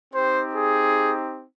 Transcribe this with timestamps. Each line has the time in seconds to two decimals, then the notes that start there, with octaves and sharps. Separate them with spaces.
0.13 C4 D#4 G4 C5
0.55 G#4